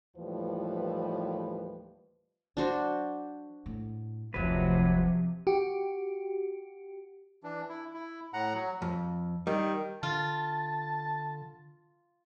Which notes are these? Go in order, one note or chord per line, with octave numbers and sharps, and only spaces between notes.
D#2 A2 E3 F3 G3 B4
F#3 D4 F#4 C5
A2
F1 D2 C3 F3 F#3 B4
F#4 G4
E3 D4
E4
E4
A2 F#5 A#5
F#3
F2
D#3 G3
D3 F4 A5